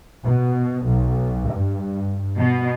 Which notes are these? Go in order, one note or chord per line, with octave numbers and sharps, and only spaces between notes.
B2
B1
G2
B2